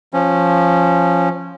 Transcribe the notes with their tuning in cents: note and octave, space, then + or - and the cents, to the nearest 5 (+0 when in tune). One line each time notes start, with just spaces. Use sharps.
F3 +0 C#4 -15